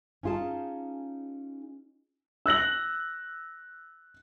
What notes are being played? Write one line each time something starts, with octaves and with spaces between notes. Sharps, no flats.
C#4 D#4 F4 G#4 A5
E6 F#6 A#6 F#7